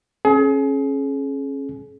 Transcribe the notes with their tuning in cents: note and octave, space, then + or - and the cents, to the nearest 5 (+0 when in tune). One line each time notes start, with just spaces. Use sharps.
C#4 -25 G#4 +35